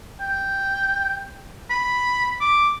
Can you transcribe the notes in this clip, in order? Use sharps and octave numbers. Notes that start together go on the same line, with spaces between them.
G5
B5
D6